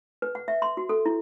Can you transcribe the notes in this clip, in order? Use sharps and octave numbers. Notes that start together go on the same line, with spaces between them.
B4
F#5
E5
C6
F#4
A4
E4